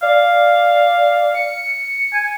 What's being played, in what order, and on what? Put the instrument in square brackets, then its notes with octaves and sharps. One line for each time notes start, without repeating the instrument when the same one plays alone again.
[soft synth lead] D5 [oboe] F5
[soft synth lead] C#7
[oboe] G#5